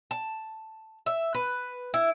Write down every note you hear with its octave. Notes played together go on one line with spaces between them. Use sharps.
A5
E5
B4
E4